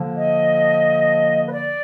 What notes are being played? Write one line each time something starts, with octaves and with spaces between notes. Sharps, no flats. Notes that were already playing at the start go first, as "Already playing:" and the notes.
Already playing: D3 F3 A#3
D#5
B4
D5